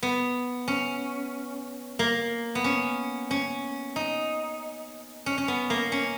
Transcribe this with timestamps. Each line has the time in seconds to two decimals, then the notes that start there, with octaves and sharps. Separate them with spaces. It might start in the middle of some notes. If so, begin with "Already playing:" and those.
0.03 B3
0.68 C#4
1.99 A#3
2.55 B3
2.64 C#4
3.31 C#4
3.96 D#4
5.26 C#4
5.38 C#4
5.48 B3
5.70 A#3
5.92 C#4